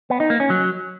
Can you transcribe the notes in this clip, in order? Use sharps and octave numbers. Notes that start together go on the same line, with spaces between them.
B3
D#4
A#3
C#4
F#3